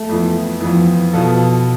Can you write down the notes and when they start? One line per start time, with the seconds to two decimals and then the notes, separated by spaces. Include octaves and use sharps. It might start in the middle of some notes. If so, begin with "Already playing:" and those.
Already playing: A3
0.09 F2 E3 B3
0.60 F2 E3 F3 B3
1.13 B2 B3 F4 A4